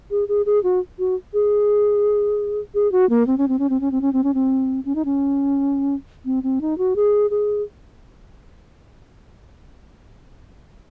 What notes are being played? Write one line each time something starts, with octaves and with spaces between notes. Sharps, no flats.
G#4
G#4
G#4
F#4
F#4
G#4
G#4
F#4
A#3
C4
C#4
C4
C#4
C4
C#4
C4
C#4
C4
C#4
C4
C#4
D#4
C#4
C4
C4
D#4
F#4
G#4
G#4